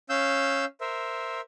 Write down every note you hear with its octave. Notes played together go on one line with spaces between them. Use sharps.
C#4 F5 E6 G6
A#4 C5 E5